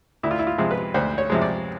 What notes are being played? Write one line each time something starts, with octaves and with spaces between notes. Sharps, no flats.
D2 E4
F4
E4
F4
C3 F3 G#3
B4
D2 C5
C#5
C3 F3 G#3
D5